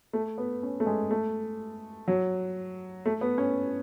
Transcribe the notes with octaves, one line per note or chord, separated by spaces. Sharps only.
A3
B3
C#4
A3
G#3
A3
F#3
A3
B3
C#4